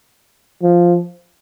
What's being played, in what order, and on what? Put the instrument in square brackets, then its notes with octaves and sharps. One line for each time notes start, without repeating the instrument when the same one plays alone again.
[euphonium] F3